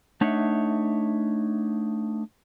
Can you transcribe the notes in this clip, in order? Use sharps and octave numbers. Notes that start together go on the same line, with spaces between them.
A3 D4 D#4 C#5 E5 F#5